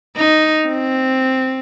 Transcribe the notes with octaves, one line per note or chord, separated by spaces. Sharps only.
D#4
C4